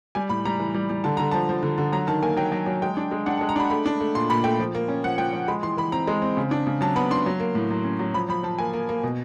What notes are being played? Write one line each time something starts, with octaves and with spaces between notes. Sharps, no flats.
G3 G#5
A2 B5
G3 A#5
E3
G3
G3
D3 A5
D3 A#5
F3 A5
F3
D3
D3
F#3 A#5
D#3 A5
A#3 G#5
F#3 G5
F#3
F#3
G#3 G5
D4
G#3
D4 F#5
A5
G#3
A#5
D4 B5
A3 B5
D4
A3
A#2 C6
A#2 B5
A3 G5
F3
A#3
C#4
F3 F#5
F3 G5
F3
G#3 B5
E3 C6
E3 B5
C4 A#5
G#3
C4
C#3
D4
C#3
F#3 A5
B3 B5
D4 C6
F#3
A#3
A2
F#3
C#4
F#3
F3 B5
F3 B5
F3 A5
A#3 G#5
A#3
A#3
B2